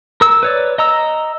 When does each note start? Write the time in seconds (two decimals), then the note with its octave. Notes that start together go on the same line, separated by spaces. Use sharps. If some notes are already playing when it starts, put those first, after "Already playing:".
0.21 A#4 E6
0.43 B4 C#5 D5
0.78 D#5 A#5 E6